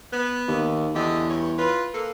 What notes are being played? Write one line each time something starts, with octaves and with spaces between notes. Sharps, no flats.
B3
D#2
E2 D3 G4 D#5
G2 C#5
F4 B4
A#3 A4 B4